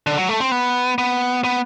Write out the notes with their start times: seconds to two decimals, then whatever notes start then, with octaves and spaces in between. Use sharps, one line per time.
0.07 D3
0.18 F#3
0.29 A3
0.40 C4
0.51 B3
0.98 B3
1.44 B3